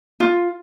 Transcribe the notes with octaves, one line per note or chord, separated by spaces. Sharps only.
F4